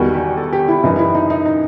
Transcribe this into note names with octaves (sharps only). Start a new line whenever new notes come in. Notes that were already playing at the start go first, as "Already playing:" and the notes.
Already playing: E2 D#3 G3 F#4
G4
A4
G4
E4
F#2 E3 G3 D#4
E4
D#4
D#4
D#4